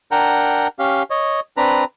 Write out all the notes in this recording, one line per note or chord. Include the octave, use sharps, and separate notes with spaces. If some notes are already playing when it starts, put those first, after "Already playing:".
D4 A#4 F#5 G5 A#5
C#4 G4 F5
C#5 D#5
C4 D4 B4 A#5 B5